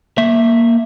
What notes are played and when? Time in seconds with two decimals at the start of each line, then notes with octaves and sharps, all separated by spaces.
0.18 A#3 E5